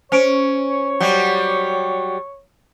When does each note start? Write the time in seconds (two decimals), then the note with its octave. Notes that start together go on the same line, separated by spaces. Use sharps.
0.12 C#4 C5 C#5 D7
1.00 F#3 G3